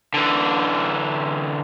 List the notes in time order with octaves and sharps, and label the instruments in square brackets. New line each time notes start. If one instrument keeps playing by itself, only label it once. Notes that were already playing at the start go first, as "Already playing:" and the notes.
[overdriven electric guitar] D3 E3